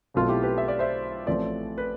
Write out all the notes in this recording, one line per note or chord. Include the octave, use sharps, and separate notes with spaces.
B1 B2 A3 C4 F4
E4 G4
G4 B4
E5
D5
C5 E5
A1 A2 F3 A3 C4 B4 D5
B4